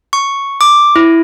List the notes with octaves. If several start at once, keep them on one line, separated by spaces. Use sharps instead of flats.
C#6
D6
E4